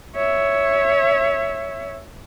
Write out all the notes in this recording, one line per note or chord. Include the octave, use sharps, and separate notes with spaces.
C#5 E5